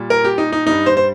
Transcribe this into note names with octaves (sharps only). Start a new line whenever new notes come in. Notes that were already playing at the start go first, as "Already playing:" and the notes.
Already playing: A#2 G3
A#4
G4
D#4
D#4
G2 G3 D#4
C5
C5